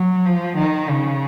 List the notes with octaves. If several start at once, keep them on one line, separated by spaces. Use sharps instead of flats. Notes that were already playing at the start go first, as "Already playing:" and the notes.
Already playing: F#3
F3
D#3
C#3